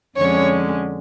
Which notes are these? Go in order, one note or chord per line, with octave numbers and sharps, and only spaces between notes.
F2 D3 G#3 C#4 C#5